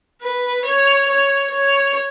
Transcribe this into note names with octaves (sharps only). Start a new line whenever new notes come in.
B4
C#5
C#5
C#5